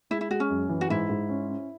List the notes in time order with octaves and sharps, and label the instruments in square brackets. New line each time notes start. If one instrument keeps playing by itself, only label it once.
[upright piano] G#3 [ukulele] E4
[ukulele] E4
[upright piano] G#3 [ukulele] F#4
[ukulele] C#4
[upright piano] F#2
E3
[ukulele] F#4
[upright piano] G#2 [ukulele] E4
[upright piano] G#2
C#4
C#4